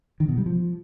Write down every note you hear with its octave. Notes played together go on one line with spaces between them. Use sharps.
D#3
B2
G3
F3